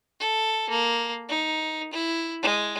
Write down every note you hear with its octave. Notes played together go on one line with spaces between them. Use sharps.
A4
A#3
D#4
E4
G#3